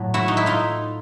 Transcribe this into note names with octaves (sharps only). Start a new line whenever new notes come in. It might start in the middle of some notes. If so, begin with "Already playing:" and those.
Already playing: A2 F#3
E4 F#4
D#4
E4
D#4 F4